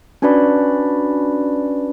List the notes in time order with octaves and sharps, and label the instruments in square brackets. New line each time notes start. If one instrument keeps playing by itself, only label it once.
[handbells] C#4 D4 F#4 B4 D5 B5